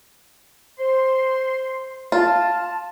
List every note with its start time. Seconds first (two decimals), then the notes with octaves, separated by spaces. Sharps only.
0.78 C5 C6
2.12 F4 F5 A5